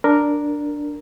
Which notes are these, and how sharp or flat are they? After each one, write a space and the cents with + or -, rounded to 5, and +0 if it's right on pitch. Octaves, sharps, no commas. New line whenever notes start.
D4 +0 A#4 +0